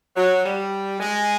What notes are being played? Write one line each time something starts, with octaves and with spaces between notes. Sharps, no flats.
F#3
G3
G#3